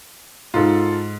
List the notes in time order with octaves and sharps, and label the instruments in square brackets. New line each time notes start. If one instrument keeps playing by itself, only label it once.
[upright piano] G#2 [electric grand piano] F4 A4